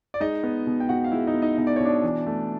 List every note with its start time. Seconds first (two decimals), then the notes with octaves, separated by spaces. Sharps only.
0.14 D5
0.20 G#3 D#4 D#5
0.43 B3
0.67 B2
0.80 G5
0.89 B2 F#4 F#5
1.04 F5
1.12 G#3 E4 E5
1.27 D#4 D#5
1.34 B3
1.42 D#4 D#5
1.58 B2 D#5
1.67 D5
1.76 B2 C#5
1.85 D4 D5
2.04 E3
2.26 A3